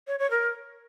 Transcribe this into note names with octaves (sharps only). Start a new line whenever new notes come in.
C#5
C#5
A#4